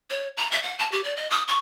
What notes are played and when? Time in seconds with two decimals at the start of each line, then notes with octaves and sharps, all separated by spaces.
0.10 C#5
0.37 A#5
0.52 E5
0.63 F#5
0.79 A5
0.92 G4
1.04 D5
1.16 D#5
1.30 D#6
1.48 C#6